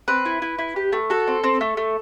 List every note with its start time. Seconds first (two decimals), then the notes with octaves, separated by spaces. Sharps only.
0.08 C4 B4
0.25 E4
0.42 E4
0.59 E4
0.76 G4
0.93 A3
1.10 F#4 A4
1.28 C4
1.44 C4
1.61 A3
1.77 A3